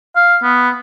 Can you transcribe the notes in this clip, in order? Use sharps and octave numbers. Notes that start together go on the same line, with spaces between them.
F5
B3